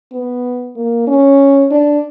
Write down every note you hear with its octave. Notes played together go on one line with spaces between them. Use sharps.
B3
A#3
C#4
D4